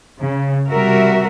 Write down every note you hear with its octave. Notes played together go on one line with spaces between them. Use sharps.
C#3
C3 G3 F#4 A#4 E5